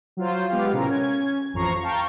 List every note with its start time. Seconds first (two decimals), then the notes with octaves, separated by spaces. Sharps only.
0.17 F#3 F4 C5
0.49 G#3 B3 F4 G4 F5
0.73 A2 C3 C4 C#4 A#4
0.90 C#4 G#6
1.53 A1 F2 F3 A#5 C#6 C7
1.83 F5 G5 A5 A#5 C#6